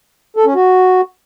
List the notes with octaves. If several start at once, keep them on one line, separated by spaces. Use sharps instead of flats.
A4
C#4
F#4